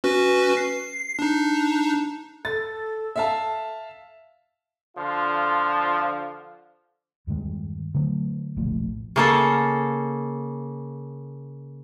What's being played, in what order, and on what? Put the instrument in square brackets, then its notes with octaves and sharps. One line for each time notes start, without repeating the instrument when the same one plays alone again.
[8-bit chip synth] C#4 F#4 B4
C7
D4 D#4
[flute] A4 [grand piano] A6
[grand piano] E5 F5 A5
[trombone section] D3 F3 F4
[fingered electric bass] E2 G2 D#3 G#3
D3 F#3 A3
E1 A#1 A2 F3
[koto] C#3 A#3 A4